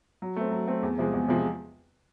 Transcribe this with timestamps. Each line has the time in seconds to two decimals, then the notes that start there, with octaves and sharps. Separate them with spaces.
0.22 F#3
0.36 A3 C4
0.52 F#3
0.68 A3 C4
0.83 E2
0.98 C3 F3 G#3
1.13 E2
1.28 C3 F3 G#3